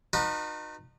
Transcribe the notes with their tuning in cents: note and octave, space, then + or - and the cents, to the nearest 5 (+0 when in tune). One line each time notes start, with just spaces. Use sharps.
D#4 -30 F#4 -45 B4 -30